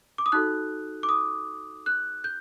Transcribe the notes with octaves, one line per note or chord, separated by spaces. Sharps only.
D6
D#6
D#4 F#4 A4 F#6
D6
D#6
F#6
G6